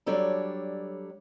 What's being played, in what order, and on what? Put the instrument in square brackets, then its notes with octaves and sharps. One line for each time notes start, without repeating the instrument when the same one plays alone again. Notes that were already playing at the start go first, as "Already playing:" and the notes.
[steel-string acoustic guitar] F#3 G3 D4 A4 C#5 D5